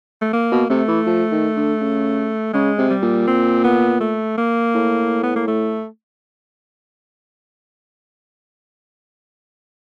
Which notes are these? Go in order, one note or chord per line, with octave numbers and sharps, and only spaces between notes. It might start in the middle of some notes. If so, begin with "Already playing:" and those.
A3
A#3
B2
C3 A3
E3
F3
D#3
D3
C#3
C#3 G#3
C3
G3
A#2
C4
B3
A3
A#3
A2
B3
A#3
A3